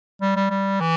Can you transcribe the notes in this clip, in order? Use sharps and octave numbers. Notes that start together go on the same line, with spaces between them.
G3
G3
G3
E3